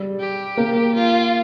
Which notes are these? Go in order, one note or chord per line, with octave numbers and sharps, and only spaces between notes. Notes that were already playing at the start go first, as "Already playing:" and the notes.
Already playing: G3
G4
A#3
F4